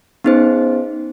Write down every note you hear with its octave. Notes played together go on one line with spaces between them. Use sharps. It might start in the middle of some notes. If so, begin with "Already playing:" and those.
B3 C#4 D#4 G#4 C5